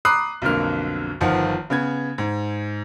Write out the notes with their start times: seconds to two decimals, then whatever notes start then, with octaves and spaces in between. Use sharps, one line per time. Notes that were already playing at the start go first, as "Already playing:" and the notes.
0.05 A#5 B5 D6 D#6 F#6 C7
0.42 B1 F2 D3 A#3 F6
1.21 G1 D#3 F3 F#5
1.70 C#3 B3 G#6
2.18 G#2